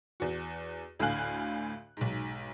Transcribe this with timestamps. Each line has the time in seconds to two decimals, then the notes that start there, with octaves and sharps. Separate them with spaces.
0.20 E2 F#4
1.00 D2 A2 F5 G#5 F#6
1.97 B1 G#2